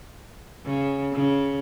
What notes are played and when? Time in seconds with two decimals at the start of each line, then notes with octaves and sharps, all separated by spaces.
0.65 C#3
1.13 C#3